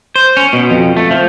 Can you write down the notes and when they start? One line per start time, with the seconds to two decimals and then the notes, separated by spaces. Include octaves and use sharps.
0.16 C5
0.37 C#4
0.53 B2
0.70 F2
0.97 A3
1.11 F3